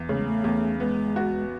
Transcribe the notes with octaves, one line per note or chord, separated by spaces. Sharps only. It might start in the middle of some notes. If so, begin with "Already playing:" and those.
Already playing: E2
C#3 A3
G#3
A3
E2
G#3 B3
F#4